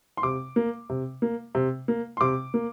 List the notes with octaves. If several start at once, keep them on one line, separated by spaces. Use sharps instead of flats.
C6
C3 D6
A#3
C3
A#3
C3
A#3
C6
C3 D6
A#3